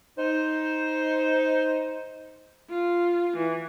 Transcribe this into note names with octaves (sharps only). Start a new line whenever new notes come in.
D#4 C5
F4
E3